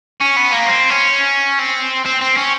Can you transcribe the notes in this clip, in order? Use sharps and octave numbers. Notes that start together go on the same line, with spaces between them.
C#4
B3
A#3
C4
C#4
C4
C4
C4
C#4